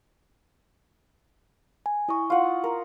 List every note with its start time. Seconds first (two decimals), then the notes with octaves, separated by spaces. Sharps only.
1.86 G#5
2.08 E4 D#5 C#6
2.30 F4 F#5
2.64 A#4